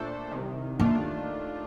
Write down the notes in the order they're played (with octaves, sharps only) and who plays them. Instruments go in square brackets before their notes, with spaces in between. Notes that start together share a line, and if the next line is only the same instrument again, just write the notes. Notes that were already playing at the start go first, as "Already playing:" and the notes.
Already playing: [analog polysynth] A#2 A3 D4 A4 C5
C2 C3 D#3
[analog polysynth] D#2 D#3 A3 D4 F4 [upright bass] A#3